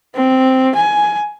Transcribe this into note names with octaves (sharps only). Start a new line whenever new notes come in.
C4
G#5